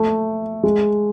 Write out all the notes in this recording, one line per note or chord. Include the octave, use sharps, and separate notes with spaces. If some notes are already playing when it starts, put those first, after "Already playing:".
Already playing: A3
G#3